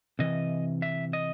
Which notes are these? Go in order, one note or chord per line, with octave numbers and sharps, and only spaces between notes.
C3 E3 D#5
E5
D#5